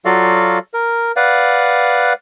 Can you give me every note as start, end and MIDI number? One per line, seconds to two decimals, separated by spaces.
0.05 0.58 54
0.05 0.58 65
0.05 0.58 66
0.05 0.58 69
0.05 0.58 74
0.05 0.58 77
0.74 1.12 70
1.16 2.13 71
1.16 2.13 74
1.16 2.13 77
1.16 2.13 78